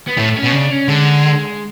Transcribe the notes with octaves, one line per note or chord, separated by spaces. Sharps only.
B3
A2 A3
C#4
B2
C#3 D4
C#4
D3 G#3